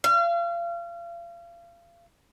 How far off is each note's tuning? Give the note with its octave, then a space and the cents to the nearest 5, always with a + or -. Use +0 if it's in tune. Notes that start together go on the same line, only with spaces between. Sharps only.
F5 -35